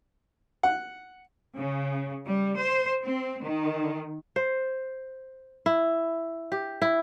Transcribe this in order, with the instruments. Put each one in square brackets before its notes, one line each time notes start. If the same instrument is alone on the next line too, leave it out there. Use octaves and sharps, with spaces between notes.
[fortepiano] F#5
[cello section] C#3
G3
C5
C4
D#3
[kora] C5
E4
G4
E4